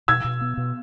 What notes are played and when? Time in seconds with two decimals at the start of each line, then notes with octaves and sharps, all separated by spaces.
0.08 B2 E6 G#6
0.24 B2
0.41 B3
0.57 B2